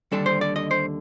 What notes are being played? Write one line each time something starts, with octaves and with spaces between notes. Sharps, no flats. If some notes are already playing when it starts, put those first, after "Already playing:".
D#2 D3 G3 D4 A4
C5
D5
D#5
C5